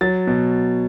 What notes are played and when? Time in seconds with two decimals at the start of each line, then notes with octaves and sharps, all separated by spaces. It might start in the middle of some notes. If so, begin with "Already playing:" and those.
0.01 F#3 A6
0.27 B2